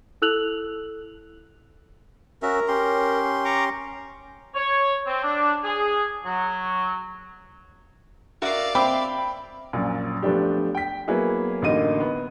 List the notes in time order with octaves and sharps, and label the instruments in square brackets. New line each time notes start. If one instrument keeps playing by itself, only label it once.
[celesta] E4 A4 E6 F#6 F7 F#7
[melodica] C#4 F#4 E5 [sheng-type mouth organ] A#4
[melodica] C#4 G4 C6
[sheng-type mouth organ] A#5 C#6 D6
[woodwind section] C#5
C4
D4
G#4
F#3
[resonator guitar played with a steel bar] F#4 A#4 E5 [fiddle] D5 F5
[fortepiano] C4 D6 [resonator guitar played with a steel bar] E5 [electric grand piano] G5 B5
[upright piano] A#1 F#2 A#2
F3 A3 B3 D4 G4
G5 B6
F#3 A#3 B3 E4 G#4
A1 D3 A#3 D#4 D#5 D#7
B3